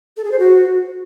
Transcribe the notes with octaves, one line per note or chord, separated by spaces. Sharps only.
A4
G#4
C5
F#4